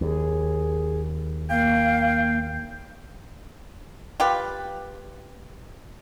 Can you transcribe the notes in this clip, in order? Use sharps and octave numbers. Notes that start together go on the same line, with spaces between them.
D#2 G#4
A#3 F5 G5
F4 G4 B4